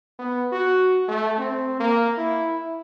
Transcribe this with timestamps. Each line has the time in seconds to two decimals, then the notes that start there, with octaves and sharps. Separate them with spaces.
0.19 B3
0.52 F#4
1.08 A3
1.38 C4
1.80 A#3
2.17 E4